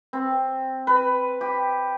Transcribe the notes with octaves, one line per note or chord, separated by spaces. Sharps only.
C4
B4
G4